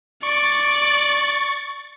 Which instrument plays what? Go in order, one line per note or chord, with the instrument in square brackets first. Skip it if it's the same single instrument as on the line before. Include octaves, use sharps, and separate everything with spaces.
[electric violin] D5 [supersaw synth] C#6 A6